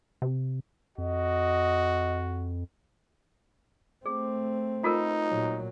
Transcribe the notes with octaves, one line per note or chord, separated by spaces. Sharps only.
C3
F2 F#4 D#5
A3 C4 G#4
D#4 F4 A4 A#4
A#2 F#3